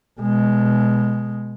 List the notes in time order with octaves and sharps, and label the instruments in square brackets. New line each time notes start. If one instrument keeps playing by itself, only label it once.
[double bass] B2 G#3